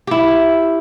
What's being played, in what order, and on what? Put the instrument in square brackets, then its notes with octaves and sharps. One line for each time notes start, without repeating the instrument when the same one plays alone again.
[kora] E4 G4